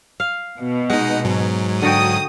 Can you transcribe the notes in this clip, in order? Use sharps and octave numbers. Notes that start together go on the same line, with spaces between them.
F5
B2
G#3 D#4 F#5
G#2 F#3
D3 F#4 G5 D#6